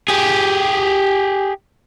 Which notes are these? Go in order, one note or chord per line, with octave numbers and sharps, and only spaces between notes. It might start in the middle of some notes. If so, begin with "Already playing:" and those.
G4 G#4